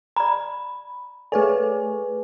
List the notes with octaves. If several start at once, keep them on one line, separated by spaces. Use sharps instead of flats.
D5 A#5 B5
A3 G#4 A4 B4 C#5 D5 G#5